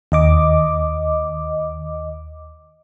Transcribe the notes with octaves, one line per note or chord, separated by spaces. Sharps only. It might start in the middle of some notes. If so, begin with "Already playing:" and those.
D#2 D#5 D6